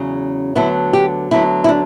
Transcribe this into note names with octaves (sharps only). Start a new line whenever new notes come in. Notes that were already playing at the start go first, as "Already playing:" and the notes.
Already playing: E2 C#3 F#3 C#4
D2 D3 F#3 B3 E4
G4
D2 D3 F#3 B3 E4
E4
D4